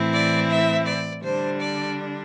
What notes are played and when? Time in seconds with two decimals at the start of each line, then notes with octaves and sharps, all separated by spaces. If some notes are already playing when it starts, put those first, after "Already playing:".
Already playing: A2 E3 C4 E4
0.13 D5
0.50 E5
0.87 D5
1.23 D3 G3 D4 C5
1.60 D5